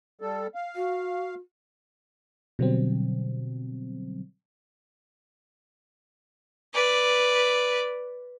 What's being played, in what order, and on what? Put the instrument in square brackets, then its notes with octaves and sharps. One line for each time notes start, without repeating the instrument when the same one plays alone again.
[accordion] G3 A4
F5
[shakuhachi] F#4
[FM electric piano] B2 D3 F#3 G3 C4
[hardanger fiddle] B4 D5